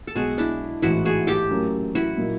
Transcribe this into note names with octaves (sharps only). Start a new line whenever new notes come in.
A4
B1 B2 G#3 F#4 G#4
D4 E4
A1 G#2 E3 E4 F#4
F#4 G#4
G4 A4
A2 F#3 A#3 C#4
E4 F#4
A#2 F#3 A#3 D#4